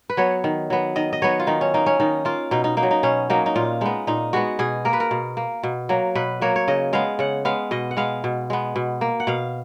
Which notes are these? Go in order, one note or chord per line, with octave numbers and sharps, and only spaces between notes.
B4
F#3 B3 C#5
D#3
F#3 B3
D#3 D#5
D#5
F#3 B3 C#5
F4
D#3 D#4
C#4
A#3 D#4
C#4
D#3 D#4
A#3 F4
B2 D#4
D#4
A#3 D#4
F#3
D#4
B2 C#4
F#3 A#3 D#4
D#4
A#2 F4
G#3 B3 D#4
A#2 D#4
G#3 B3 F#4
B2 G#4
A#3 A#4
B4
A#4
B2
A#3
B2
F#3 A#3
B2 B4
F#3 A#3 C#5
C#5
C#3 D#5
G#3 B3 F5
C#3 F#5
G#3 B3 F5
B2 D#5
F#5
G#3 B3 F5
B2
G#3 B3
B2
A#3
F#5
B2 F5